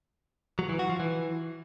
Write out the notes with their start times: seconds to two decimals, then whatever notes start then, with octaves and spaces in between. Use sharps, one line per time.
0.59 F#3
0.69 E3
0.79 F#4
0.89 F3
1.00 E3